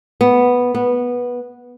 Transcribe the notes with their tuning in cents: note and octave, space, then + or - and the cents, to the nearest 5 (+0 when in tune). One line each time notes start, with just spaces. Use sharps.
B3 -5
B3 -10